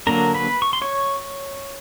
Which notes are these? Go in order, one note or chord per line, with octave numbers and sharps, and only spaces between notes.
D3 F#3 A#3 D4 A#4 A#5
B4 B5
C#6
C6
C#5 C#6